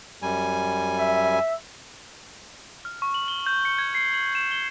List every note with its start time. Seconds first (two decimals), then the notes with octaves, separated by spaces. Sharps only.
0.22 F#2 G3 G#5
0.99 E5
2.85 F6
3.02 C#6
3.14 F#7
3.28 G7
3.46 G6
3.65 C#7
3.78 G#6
3.95 C7
4.14 F#7
4.35 E7
4.51 G7